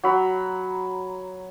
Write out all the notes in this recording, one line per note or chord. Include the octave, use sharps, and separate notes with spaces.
F#3 B5